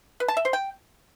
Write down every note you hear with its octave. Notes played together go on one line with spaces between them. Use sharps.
B4
A5
E5
C5
G5